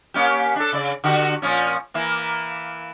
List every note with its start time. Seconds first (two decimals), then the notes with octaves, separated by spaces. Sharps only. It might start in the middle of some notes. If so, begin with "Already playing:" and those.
0.14 A#3 C#4 G4
0.56 D4 A4
0.73 C#3 D5
1.04 D3 F#4 G4
1.42 A#2 F3 C#4
1.94 E3 A#3 E4